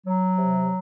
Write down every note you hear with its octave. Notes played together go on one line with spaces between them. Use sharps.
F#3
C3